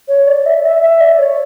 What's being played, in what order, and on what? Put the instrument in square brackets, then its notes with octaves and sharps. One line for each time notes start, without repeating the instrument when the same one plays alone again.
[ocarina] C#5
D5
E5
E5
E5
D5
C#5